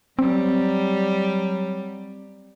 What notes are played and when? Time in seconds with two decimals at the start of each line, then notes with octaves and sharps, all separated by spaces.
0.19 F#3 G3 C4